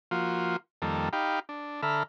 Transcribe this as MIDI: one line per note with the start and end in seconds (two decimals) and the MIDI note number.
0.11 0.57 53
0.11 0.57 58
0.11 0.57 65
0.11 0.57 66
0.82 1.09 41
0.82 1.09 51
0.82 1.09 55
0.82 1.09 58
0.82 1.09 69
1.13 1.40 63
1.13 1.40 67
1.13 1.40 77
1.13 1.40 79
1.13 1.40 83
1.49 1.81 62
1.83 2.03 50
1.83 2.03 69
1.83 2.03 76
1.83 2.03 82
1.83 2.03 83
1.83 2.03 89